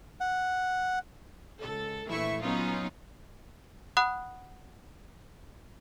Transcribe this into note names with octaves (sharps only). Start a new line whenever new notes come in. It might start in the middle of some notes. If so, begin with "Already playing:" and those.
F#5
C#2 A4
A#1 E3 A3 E4 E5 C#6
F#3 B3 C#4 D#4 F4
F#5 B5 D#6 F#6